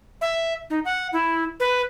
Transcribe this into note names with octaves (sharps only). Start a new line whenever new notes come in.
E5
D#4
F#5
E4
B4